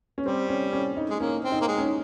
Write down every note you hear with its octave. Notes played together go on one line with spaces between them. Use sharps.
C#4
G3 C4
C#4
C#4
D#4
G#3
A#3 C#4
C4
D#4
A#3
G#3
C#4
D#4